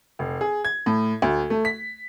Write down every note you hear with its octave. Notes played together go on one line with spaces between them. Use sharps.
F1
G#4
G#6
A2
D2
A3
B6